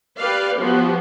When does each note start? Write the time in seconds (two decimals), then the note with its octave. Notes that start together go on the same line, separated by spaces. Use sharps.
0.18 G4 B4 D5 F5
0.58 F3 G3 B3 F#4 G4